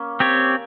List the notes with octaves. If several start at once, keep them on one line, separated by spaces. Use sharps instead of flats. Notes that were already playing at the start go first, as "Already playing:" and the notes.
Already playing: A#3 C#4
C4 G4 C#5